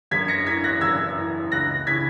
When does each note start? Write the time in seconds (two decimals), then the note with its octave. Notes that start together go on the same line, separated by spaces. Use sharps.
0.11 F#2 G#6 B6
0.28 A#6 C#7
0.46 E3 G#6 B6
0.64 F#6 A#6
0.81 F#2 E6 G#6
1.16 E3
1.51 C#2 F#6 A#6
1.86 C#3 E3 G#6 B6